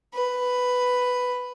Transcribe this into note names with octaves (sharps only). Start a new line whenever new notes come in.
B4